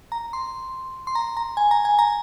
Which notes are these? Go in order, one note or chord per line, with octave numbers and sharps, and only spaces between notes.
A#5
C6
C6
A#5
A#5
G#5
A#5
G#5
A#5